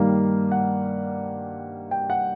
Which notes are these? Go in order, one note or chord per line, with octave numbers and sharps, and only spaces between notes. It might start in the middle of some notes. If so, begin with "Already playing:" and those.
Already playing: G2 D#3 G3 A#3 F5
F#5
G5
F#5